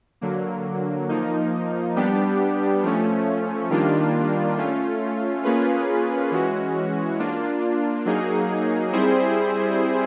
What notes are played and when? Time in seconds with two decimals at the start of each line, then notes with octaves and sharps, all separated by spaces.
0.21 D3 F#3 A#3
1.09 F3 A#3 D#4
1.96 G3 B3 D4 G4
2.83 F3 A3 C#4
3.70 D#3 G3 A#3 D4 F4
4.57 A3 C#4 F4
5.44 A#3 C#4 F4 G#4 B4
6.31 E3 G#3 C#4 F#4
7.19 A#3 D4 F4
8.06 F#3 A#3 D#4 G#4
8.93 G3 C4 E4 G#4 C5